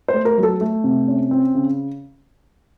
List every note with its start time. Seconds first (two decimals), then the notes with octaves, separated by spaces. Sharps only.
0.08 C5
0.14 A3
0.25 A#4
0.38 F#3
0.43 A4
0.61 A3
0.84 C3
1.08 C#4
1.31 C4
1.55 C#3